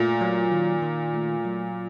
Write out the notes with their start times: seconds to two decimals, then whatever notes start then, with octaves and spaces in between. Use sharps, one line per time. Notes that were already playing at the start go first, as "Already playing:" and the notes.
Already playing: A#2 A3
0.21 F#3
0.52 D#3
0.82 D#3
1.14 A3
1.45 F#3